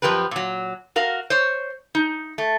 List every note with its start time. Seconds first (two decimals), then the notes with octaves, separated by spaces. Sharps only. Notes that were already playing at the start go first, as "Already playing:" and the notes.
0.02 F#2 A#2 F3 G4 A#4 B4
0.31 A#2 F#3
0.96 F#4 A#4 F5
1.30 C5 C#5
1.95 D#4
2.38 A3